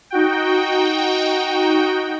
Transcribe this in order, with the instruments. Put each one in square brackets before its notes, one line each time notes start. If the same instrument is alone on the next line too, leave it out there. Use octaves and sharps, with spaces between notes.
[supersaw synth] D#4 F#4 G5